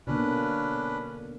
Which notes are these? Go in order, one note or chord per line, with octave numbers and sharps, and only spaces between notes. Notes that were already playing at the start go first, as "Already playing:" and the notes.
B2 D3 A#3 C#4 D4 B4